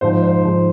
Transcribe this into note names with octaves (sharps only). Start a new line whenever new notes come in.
G#2 F3 C5
C5
G#2 F3